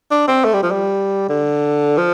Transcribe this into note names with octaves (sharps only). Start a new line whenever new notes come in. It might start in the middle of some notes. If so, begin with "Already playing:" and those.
D4
C4
A3
G3
F3
G3
D3
F3